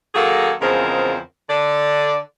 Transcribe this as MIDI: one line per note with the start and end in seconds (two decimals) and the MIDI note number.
0.15 0.52 51
0.15 0.52 54
0.15 0.52 58
0.15 0.52 68
0.15 0.52 69
0.61 1.17 40
0.61 1.17 49
0.61 1.17 53
0.61 1.17 56
0.61 1.17 60
0.61 1.17 70
1.49 2.17 50
1.49 2.17 74